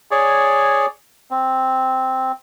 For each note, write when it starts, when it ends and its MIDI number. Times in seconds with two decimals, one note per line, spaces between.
0.11 0.86 68
0.11 0.86 73
0.11 0.86 74
1.31 2.32 60